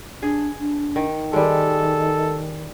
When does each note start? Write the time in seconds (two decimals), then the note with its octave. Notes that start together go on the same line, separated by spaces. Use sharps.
0.22 D4 G#4
0.59 D4
0.96 D#3
1.33 D#3 G3 G#3 A4